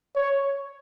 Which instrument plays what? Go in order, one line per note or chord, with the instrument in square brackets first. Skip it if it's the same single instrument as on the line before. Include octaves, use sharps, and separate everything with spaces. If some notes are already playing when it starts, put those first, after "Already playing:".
[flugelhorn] C#5